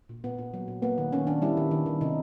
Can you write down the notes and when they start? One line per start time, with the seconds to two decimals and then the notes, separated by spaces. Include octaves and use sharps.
0.09 A#2
0.24 A#2 B3
0.38 A#2
0.54 F#3
0.68 A#2
0.82 A#3 B3
0.98 D#3
1.12 D#3 C#4
1.27 D#3 D4
1.42 G3 E4
1.57 D#3
1.71 D#3
1.86 D#3
2.01 C3 D#4